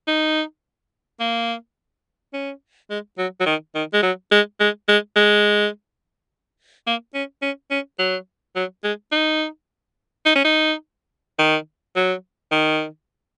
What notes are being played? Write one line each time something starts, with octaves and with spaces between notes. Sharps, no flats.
D#4
A#3
C#4
G#3
F#3
F#3
D#3
D#3
G#3
F#3
G#3
G#3
G#3
G#3
A#3
C#4
C#4
C#4
F#3
F#3
G#3
D#4
D#4
C#4
D#4
D#3
F#3
D#3